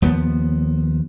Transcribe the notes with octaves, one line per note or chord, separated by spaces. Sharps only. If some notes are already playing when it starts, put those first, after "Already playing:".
D#2 F3 B3